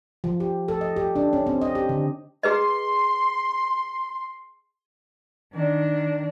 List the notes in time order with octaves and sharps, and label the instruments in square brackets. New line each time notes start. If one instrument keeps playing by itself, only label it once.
[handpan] F3
G4
A4
D#5
G4
D4
C#4
C4
D#5
G4
D3
[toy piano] G#4 B4 D#5 [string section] C6
[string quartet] D#3 D4